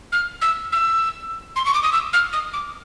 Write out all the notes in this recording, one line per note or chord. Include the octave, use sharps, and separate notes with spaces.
F6
E6
E6
C6
C#6
D6
D#6
E6
F6
D#6
D6